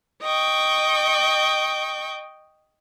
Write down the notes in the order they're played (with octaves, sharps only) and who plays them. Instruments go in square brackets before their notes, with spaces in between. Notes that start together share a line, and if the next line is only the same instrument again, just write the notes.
[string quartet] D#5 G5 C#6